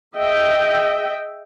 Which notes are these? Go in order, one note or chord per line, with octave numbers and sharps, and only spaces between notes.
G#4 D#5 E5 G5